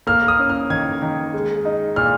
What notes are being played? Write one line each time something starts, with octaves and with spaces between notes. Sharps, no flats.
A#3 F6
D#6
C#4
F6
D#3 G#6
D#3
G#3
D#4
A#2 F6